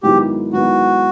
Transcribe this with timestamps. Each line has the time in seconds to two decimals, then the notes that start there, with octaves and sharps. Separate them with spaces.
0.03 G#2 D#3 F#3 B3 E4 G4
0.53 G#2 D#3 F#3 B3 E4 F#4